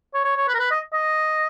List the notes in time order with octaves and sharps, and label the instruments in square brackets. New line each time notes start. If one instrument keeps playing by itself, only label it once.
[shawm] C#5
C#5
C#5
B4
A#4
B4
D#5
D#5